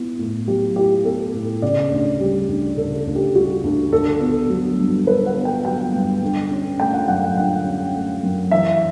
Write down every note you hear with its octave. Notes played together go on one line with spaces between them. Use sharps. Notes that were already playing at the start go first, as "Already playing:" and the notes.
Already playing: B3 E4
A2
F#3 G4
E4 G4
B3 A4
A2
C#3 D5
D2
G3
D2
C#3 A4
A4
D2
G4
G3 F#4
D2
D3 A4
B3
F#3
G2
D3 B4
F#5
B3
G5
F#3 G5
G2
D3
C#4
A3 G5
F#5
F#2 F#5
F#5
D3 F#5
C#4
A3
F#2
E3 E5